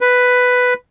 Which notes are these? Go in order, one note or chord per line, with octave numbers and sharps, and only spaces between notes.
B4